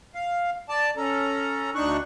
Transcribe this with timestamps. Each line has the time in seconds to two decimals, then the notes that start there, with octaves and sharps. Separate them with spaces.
0.15 F5
0.69 D5 A5
0.97 C#4 A4 A#5
1.75 D2 D4 D#4 C#6 F#6